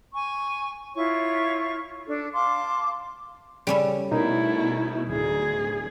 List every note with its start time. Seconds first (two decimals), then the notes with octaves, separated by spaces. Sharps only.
0.14 G#5 C#6
0.95 E4 F4 C#5 C#6
2.07 D4 A4
2.32 F5 A5 C6 D6
3.67 C#3 G3 C#4 A4
4.11 B2 A3 D#4 E4 A#4
5.08 D1 D2 G#4